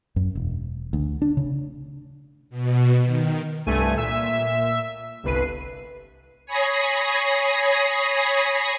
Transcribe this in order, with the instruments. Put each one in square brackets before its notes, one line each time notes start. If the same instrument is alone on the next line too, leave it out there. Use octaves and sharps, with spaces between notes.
[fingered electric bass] F#2
E1
D2
D4
C#3
[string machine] B2
D#3
[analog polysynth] C2 G2 A3 G#5 D#7
A#2 E5
G1 C2 B4 C7 D#7
[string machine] C#5 G#5 B5 D#6 A#6 C7